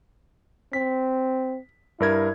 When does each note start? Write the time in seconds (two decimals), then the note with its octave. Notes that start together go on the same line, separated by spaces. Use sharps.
0.73 C4 B6
2.00 G2 E4 A#4 G#6